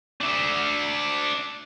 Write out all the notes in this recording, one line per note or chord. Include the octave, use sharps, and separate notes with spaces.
D4 E5